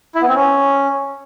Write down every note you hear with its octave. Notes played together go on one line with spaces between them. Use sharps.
E4
B3
C4
C#4